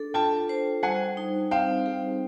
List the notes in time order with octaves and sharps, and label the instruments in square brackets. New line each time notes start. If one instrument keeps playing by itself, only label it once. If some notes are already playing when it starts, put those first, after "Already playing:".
Already playing: [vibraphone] D4 A4
[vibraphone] F4 [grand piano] G5 A5
[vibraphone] C5
[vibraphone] G3 [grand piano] F#5 G#5
[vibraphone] D#4
[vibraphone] C4 [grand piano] F5 G5
[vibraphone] G#4